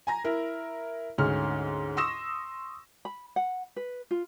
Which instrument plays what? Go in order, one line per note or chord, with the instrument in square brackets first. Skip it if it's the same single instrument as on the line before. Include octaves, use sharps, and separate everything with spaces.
[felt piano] G#5 A#5 A#6
E4 A#4
D2 G#2 C#4 F6
C6 C#6 D#6 E6 A#6 E7
[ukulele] B5
F#5
B4
F4